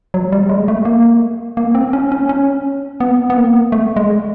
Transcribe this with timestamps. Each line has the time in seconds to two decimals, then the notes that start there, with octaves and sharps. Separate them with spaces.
0.14 F#3
0.32 G3
0.49 G#3
0.68 A3
0.85 A#3
1.57 A#3
1.75 C4
1.93 C#4
2.12 C#4
2.29 C#4
3.00 B3
3.30 B3
3.37 A#3
3.72 A3
3.96 G#3